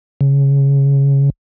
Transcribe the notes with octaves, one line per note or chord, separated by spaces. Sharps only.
C#3